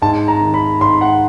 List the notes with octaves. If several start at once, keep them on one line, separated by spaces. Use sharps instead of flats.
G#2 A5
A#5
D#3
B5
G#2 C6
F#5